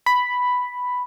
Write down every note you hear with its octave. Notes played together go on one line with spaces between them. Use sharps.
B5